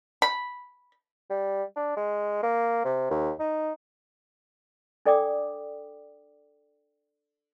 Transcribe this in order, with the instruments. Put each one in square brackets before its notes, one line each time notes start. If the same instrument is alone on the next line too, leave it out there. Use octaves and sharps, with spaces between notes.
[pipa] B5
[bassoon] G3
D4
G#3
A#3
C3
D#2
D#4
[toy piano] D4 A4 D5 G5 D6 D#6